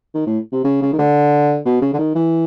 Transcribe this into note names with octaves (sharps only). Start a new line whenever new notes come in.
D#3
A2
C3
C#3
C#3
D#3
D3
B2
C#3
D3
D#3
E3